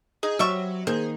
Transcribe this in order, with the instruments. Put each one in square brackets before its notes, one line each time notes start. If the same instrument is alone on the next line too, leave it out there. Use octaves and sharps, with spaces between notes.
[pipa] D#4 [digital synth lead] G#4
[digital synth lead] F#3 [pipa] G3 E5 C#6 [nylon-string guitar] C4
[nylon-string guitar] D#3 A#3 [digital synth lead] G#4 [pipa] C5